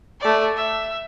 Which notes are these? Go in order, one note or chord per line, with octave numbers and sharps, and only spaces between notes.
A3 D5
E5